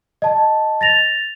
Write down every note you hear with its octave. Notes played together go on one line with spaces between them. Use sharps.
D#5 A5
A6 A#6 F7